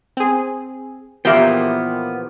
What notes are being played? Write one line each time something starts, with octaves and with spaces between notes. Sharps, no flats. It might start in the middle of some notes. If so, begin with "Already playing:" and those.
C4 G#4
A#2 E3 F3 B3 G4 A#4 E5 G5